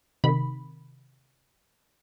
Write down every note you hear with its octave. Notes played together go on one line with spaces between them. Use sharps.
C3 D#3 B5